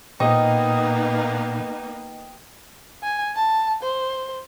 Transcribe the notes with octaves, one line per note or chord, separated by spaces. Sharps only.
A#2 A#3 B3 D#4 D#5 G5
G#5
A5
C5